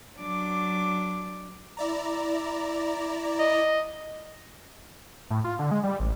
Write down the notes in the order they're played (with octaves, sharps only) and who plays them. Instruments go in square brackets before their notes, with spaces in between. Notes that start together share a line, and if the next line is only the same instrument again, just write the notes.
[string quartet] F#3 D4 D6
[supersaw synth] E4 D5 A#5
[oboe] D#5
[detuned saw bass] A2
F4
D3
G#3
G3
A1